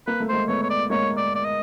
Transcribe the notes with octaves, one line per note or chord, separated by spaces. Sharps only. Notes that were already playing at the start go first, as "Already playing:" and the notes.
A#3 B4
A3
G#3 A#3 C5
A3 B3 C#5
C#5
D5
G#3 A#3 C#5
D5
D5
D#5